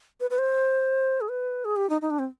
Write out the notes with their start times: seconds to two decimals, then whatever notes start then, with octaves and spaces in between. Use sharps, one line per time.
0.20 B4
0.30 B4
0.38 C5
1.21 G#4
1.29 B4
1.65 G#4
1.76 G4
1.90 D#4
2.01 D#4
2.10 D4
2.19 C4